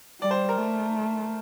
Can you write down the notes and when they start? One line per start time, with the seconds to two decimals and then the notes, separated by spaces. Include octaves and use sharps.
0.22 G3 D5
0.31 C5
0.49 A#4
0.58 A3